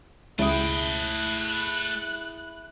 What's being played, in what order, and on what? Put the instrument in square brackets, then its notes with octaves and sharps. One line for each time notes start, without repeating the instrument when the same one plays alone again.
[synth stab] C#2 [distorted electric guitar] A3 G5 [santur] E4 G#4 [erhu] F#6